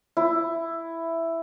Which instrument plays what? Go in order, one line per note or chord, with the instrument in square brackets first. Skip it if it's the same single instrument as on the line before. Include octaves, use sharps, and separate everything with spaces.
[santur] E4